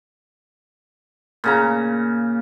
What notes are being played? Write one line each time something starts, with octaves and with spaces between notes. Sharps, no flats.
A#2 C#3 A#5